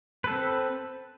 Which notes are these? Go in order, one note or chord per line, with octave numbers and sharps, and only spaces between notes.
C4 A4 B4